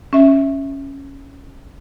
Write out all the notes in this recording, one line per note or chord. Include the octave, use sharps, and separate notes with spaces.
C#4 E5